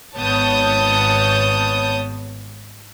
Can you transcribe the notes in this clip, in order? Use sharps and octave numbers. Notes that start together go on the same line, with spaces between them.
G#1 B3 C#5 A5 D#6 G6